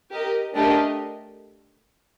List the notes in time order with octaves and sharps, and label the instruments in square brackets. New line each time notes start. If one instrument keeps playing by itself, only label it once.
[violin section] G4 A#4 D#5
A3 D4 G4 A#4 D#5